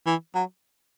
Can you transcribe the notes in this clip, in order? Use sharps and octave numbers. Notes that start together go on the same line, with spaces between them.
E3
F#3